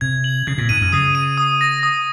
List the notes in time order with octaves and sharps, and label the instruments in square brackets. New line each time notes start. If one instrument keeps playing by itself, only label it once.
[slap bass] C3 [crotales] G#6
[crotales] F#7
[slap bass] C#3 [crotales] G#6
[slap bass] A#2
[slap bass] G#2 [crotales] D#7
[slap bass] F#2
[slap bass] C#3 [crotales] D#6
[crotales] D#7
D#6
A#6
D#6